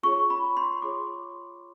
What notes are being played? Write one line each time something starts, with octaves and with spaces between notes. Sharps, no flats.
F4 G#4 C#5 C#6
B5
C6
F4 G#4 C#5 D6